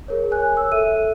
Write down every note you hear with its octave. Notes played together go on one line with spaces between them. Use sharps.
G#4 A#4 C#5
C#5 G#5 F#6
E6
A4 E5 D#7